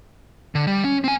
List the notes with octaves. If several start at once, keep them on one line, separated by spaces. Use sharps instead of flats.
D3
G3
C#4
C4 G#5